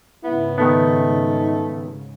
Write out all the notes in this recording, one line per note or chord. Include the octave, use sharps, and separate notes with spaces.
G#2 C#3 B3 E4
D#3 A3 B3 D#4